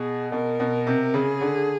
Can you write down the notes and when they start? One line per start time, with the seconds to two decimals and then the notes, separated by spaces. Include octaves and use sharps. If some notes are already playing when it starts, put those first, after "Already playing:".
Already playing: B2 G#4
0.32 B2 A#4
0.60 B2
0.87 C3
1.13 C#3 G#4
1.41 D3